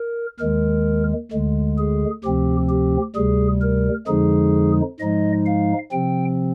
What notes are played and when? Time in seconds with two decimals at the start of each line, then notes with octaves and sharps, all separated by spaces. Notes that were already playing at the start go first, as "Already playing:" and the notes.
Already playing: A#4
0.39 D#2 D#3 G#3 A#4
1.31 D2 D3 G#3
1.78 G#4
2.24 D2 C3 F3 C4 G4
2.69 G4
3.15 D2 C3 G3 G#4
3.62 A#4
4.07 F2 D3 F3 G#3 D#4 G#4
5.00 G#2 F3 G#3 D#4 D#5
5.46 F5
5.92 C3 F3 C4 G5